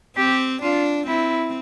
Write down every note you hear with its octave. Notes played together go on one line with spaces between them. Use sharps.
C4 G4
D4 F4
C4 E4